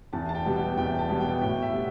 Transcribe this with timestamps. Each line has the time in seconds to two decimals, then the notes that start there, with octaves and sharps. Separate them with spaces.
0.13 E2 A5
0.29 A5
0.35 G5
0.46 B2 G3 B3
0.56 G5
0.77 E2 G5
0.99 A5
1.09 B2 G3 B3
1.20 G5
1.42 A2 G5
1.62 E5
1.73 G3 B3